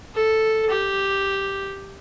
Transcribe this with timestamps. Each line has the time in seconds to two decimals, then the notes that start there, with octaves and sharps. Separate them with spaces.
0.15 A4
0.70 G4